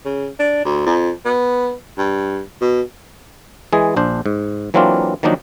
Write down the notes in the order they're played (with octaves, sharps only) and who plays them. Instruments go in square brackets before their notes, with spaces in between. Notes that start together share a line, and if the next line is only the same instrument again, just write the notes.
[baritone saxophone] C#3
D4
D2
F2
B3
G2
B2
[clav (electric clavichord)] E3 G#3 G#4
A#1 D4 C5
G#2
E3 F#3 A#3 C4 D4 F4
D#3 F3 F#3 A#3 D4 D#4